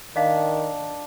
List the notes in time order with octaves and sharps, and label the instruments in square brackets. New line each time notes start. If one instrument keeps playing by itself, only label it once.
[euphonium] D#3 [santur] D4 [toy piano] D#5 F5